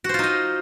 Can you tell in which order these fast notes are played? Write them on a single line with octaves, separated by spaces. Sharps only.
F#4 C5 F4 D#4 D#5